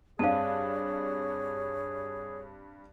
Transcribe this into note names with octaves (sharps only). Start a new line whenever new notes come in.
G2 C4 D4 G#4 C#5 F5 A5